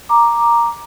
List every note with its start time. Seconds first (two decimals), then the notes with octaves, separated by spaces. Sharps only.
0.09 A#5 D6